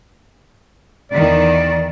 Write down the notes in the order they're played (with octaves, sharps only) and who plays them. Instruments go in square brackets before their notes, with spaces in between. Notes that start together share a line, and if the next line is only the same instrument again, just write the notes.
[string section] E2 D#3 [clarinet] D5